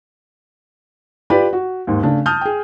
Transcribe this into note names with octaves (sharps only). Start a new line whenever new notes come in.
F4 G4 B4 D5 G5 B5
F#4
D#2 G#2
C#3 A3 D4
A5 D#6 F6 G6
G#4 G5